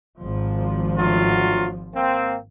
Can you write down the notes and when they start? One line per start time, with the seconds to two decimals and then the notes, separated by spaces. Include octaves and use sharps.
0.19 G#1 F3
0.96 D2 F#3 F4
1.94 A#3 C4